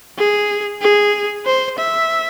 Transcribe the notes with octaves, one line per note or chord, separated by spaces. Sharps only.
G#4
G#4
C5
E5